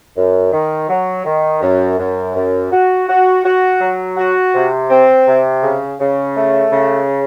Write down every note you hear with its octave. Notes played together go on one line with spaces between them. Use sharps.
F#2
D#3
F#3
D#3
F#2
F#2
F#2
F#4
F#4
F#4
F#3
F#4
C3
C4
C3
C#3
C#3
A3
C#3